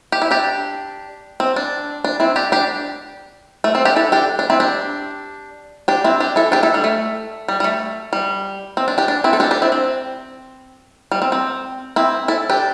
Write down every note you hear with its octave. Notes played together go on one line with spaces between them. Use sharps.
G4
E4
D4 G4
C4
D4
D4
C4 E4
D4 G4
D4 G4
A3
C4
D4 G4
E4 A4
D4 G4
D4
C4 E4
D4 G4
D4 G4
C4 E4
D4 G4
E4 A4
D4 G4
E4 A4
G3
A3
G3
G3
A3
G3
C4
D4
D4 G4
D4
C4 E4
A4
D4 G4
D4 G4
C4 E4
C4
G3
C4
C4
C4 E4
E4 A4
D4 G4